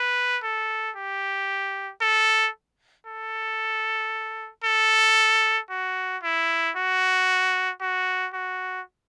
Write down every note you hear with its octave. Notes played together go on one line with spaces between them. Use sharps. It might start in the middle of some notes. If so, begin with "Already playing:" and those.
Already playing: B4
A4
G4
A4
A4
A4
F#4
E4
F#4
F#4
F#4